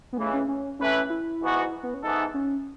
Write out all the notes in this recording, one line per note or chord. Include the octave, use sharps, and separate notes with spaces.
B3
C#2 C#3 E3 A3
C#4
C#4
E3 A3 C#4 E4 B4
C#4
E4
G#2 E3 B3 F#4
B3
C#4
G#2 E3 B3 D#4 E4 A4
C#4